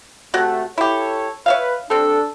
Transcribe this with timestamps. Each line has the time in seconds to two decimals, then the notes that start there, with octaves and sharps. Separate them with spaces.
0.34 C3 A3 F#4 F#5
0.78 E4 G4 A4 C#5
1.46 B4 C#5 E5 F5
1.90 G3 C4 D4 A4